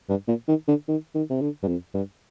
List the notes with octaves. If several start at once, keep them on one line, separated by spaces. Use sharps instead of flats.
G2
A#2
D#3
D3
D#3
D#3
C3
D3
G2
F2
G2